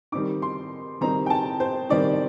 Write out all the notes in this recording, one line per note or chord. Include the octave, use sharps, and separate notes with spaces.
D#3 G3 C4 D#4 D6
C6
D#3 G3 C4 D#4 A#5
G5
A5
C5
D#3 G3 C4 D#4 D5